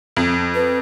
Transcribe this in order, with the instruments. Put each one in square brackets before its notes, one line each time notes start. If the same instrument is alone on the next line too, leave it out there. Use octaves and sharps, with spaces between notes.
[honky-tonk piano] F2
[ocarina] B4